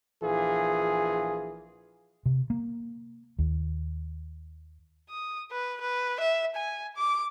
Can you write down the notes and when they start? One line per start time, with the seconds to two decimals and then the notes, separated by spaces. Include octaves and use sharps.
0.23 A#1 E3 F4 G#4
2.26 C3
2.50 A#3
3.39 D#2
5.09 D#6
5.51 B4
5.81 B4
6.20 E5
6.56 G#5
6.97 D6